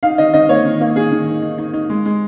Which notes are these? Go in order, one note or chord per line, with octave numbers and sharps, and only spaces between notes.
D#4 F5
D#3 D#5
D#3 D#5
A#3 C#5
D#3
A#3
D#3 G#4
D#3
D#4
D#4
D#4
D#4
G#3
G#3